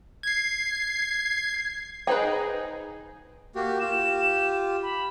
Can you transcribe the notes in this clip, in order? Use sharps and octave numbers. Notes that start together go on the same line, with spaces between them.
G#6 C7
D#4 G#4 B4 C5 G5
A#3 F#4 G4
F4 G4 E7
B5